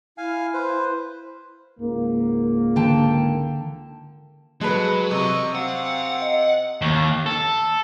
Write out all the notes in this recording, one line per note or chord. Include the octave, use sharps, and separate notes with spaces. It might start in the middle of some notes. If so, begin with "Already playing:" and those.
E4 F5 G#5
B4 C5
C#2 G#2 A#3
D3 G5 A5
F#3 G#3 A4 B4
C3 D#5 C#6
C4 F5 F#5
D#5
D#2
A4